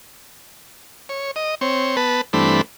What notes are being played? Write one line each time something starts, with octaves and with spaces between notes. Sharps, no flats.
C#5
D#5
C4 C#5
B3 B4 A5
G2 E3 A3 C4 D4 B5